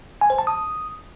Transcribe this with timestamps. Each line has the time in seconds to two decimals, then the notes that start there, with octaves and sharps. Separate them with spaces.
0.21 G#5
0.30 C5
0.39 A5
0.47 D#6